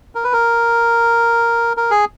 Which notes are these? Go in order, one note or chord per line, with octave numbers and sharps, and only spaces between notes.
A#4
B4
A#4
A#4
G#4